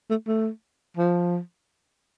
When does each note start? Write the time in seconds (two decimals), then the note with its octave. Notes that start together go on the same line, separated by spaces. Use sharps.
0.11 A3
0.28 A3
0.97 F3